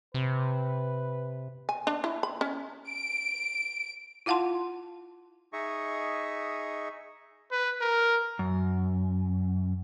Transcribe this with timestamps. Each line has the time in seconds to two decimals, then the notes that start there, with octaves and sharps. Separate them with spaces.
0.14 C3 B4
1.69 G#5
1.87 D4
2.04 E4
2.23 B5
2.41 C#4
2.89 D7
4.26 E4 F4 F5 F#5 A5 C6
5.53 D#4 G#4 D#5 E5 C#6
7.51 B4
7.81 A#4
8.39 F#2